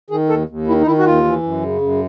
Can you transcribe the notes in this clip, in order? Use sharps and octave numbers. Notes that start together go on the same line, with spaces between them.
D#3 G#4
D#2 A4
D#2
D#3 E4
D#4
D#3 E4
F#4
D#2 F4
E3
F#2
C#3
F#2